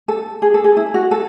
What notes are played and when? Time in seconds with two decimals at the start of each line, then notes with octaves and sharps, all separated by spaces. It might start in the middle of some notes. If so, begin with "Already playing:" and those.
0.08 A4
0.42 G#4
0.54 A4
0.64 G#4
0.77 E4
0.94 F#4
1.11 A4